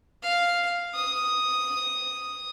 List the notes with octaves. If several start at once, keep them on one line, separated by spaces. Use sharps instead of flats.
F5
D#6